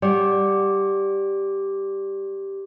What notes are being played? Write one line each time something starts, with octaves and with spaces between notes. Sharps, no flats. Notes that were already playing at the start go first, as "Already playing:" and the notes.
G3 G4 D5 F#5 D6